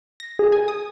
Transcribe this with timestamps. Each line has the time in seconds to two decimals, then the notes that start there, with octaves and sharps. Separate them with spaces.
0.20 A#6
0.39 G#4
0.52 G#5
0.68 D#6